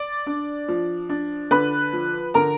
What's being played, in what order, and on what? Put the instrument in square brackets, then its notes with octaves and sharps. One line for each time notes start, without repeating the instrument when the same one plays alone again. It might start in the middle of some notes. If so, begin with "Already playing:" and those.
Already playing: [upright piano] D5 D6
D4
F3
D4
D3 B4 B5
F3
D3 A#4 A#5